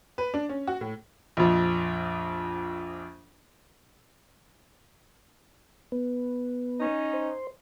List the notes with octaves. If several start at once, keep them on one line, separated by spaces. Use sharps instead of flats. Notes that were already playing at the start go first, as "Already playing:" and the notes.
B4
D4
C#4
F#4
A2
A#1 F2
B3
C#4 D#4
C5